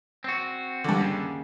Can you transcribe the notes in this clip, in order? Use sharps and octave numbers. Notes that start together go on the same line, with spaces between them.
C4 F#4
G2 D3
D#2 C#3